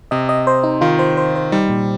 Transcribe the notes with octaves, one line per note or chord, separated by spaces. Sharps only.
C3 D#5
D#5
C5
D#4
D#3 F4
C5
C5
C5
G3 D#4
A#2